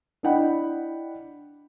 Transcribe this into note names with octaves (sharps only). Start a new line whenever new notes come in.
D4 E4 D#5 F#5 G5 B5